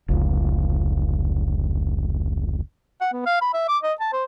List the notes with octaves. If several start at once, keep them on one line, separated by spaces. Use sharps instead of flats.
F1 C#2
F#5
B3
F5
B5
E5
D6
D#5
A5
C5